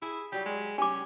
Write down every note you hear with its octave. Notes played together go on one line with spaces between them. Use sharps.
E4 G#4
F#3 G3 G4
G#3
C#4 G4 G#5 D6